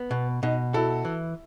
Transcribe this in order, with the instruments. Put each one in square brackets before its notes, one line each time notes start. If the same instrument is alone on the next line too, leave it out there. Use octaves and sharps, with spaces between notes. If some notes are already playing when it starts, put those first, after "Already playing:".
Already playing: [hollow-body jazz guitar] B3
B2
[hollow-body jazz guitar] B2 [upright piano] D#4
[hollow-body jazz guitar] E4 [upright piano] F#4 A4
[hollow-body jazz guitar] E3